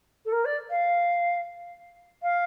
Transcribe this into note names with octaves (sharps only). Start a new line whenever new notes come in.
A4
A#4
D5
F5
F5